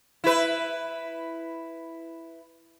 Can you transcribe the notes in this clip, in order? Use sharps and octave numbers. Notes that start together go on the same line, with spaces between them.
E4 B4